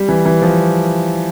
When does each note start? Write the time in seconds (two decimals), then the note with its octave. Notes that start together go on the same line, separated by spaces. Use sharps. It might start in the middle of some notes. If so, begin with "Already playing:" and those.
Already playing: G3
0.09 E3
0.26 E3
0.42 F3